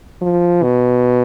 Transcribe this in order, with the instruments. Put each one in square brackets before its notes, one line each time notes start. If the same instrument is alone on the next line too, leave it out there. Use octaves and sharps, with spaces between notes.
[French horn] F3
B2